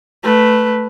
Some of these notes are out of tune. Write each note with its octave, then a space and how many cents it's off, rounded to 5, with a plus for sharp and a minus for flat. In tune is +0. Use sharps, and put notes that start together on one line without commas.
A3 +0 B4 +0